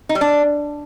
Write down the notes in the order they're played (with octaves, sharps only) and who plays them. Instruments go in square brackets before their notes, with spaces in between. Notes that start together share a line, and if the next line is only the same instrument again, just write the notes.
[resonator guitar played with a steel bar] D#4
G3
D4